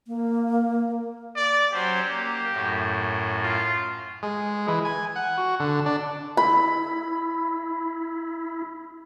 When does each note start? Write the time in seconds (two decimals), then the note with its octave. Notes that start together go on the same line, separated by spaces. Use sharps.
0.08 A#3
1.36 D5
1.73 F#3 C#4 G4 C5
2.08 A#3
2.52 F#2 A2
3.43 F4
4.23 G#3
4.68 E3
4.85 G#5
5.16 F#5
5.37 F#4
5.60 D3
5.86 D4
6.37 E4 B5